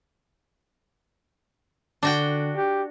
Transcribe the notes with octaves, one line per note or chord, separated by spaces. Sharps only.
D3 D4 F#4 G5
G4